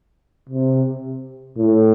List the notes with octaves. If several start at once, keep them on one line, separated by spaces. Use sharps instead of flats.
C3
A2